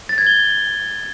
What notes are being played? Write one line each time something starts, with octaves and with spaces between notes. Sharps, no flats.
A6
G#6
G7